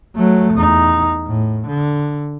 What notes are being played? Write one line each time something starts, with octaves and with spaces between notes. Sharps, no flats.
F#3 A3
E2 D#4
A2
D3